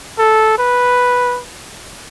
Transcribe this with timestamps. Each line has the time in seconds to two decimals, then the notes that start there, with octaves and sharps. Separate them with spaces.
0.19 A4
0.59 B4